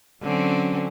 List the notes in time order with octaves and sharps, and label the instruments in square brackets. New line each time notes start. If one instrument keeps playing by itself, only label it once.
[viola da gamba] D3 C4 [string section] F#3 C#4